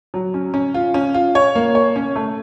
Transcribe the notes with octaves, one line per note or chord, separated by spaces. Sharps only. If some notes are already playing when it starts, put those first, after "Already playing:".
F#3
C#4
C#4
F4
C#4
F4
C#5
A#3
C#5
C#4
A3